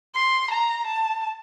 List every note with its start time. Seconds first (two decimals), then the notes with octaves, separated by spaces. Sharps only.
0.15 C6
0.51 A#5
0.87 A5